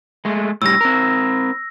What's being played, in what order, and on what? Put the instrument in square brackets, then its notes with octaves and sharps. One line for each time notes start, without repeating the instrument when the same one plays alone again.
[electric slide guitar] G#3 A3
[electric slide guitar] A2 G3 [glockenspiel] E6 A#6
[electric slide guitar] C4 A#4